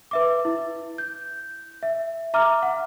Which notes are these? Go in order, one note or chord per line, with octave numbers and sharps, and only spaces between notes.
B4 E5 D6
E4
G6
E5
E5 A#5 D6 F6
F#5